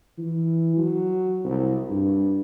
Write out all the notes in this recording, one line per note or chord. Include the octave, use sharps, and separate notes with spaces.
E3
F#3
C2
G2